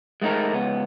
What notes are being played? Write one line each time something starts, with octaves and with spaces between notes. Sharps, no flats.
G#3 A3 B3 D#4 A#4
C#2 B3